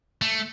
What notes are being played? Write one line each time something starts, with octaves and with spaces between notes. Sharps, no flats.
A3